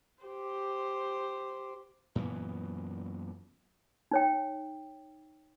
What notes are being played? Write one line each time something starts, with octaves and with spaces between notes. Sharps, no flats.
G4 C5
F#2 A#2 E3 B3
D#4 C#5 G5